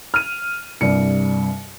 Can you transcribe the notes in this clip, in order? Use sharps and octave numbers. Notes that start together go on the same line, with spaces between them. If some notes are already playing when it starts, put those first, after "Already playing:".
F6 D#7
C2 G2 D5 C#7